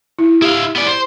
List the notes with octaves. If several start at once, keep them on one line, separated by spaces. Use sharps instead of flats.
E4
E4 G4 F5
B3 D5
C5